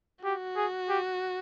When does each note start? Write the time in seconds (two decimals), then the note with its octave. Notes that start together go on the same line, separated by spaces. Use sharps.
0.25 F#4 G4
0.56 G#4
0.89 G4